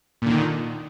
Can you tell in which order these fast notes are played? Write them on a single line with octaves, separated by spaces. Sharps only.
A#2 D3 D#3